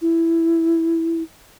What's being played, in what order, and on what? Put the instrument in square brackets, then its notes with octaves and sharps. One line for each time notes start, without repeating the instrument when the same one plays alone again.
[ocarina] E4